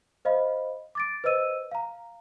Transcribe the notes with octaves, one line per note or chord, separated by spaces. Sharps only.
C5 D#5 F5 B5
D6 A6 D7
B4 C5 D#5 E6 D#7
F5 A#5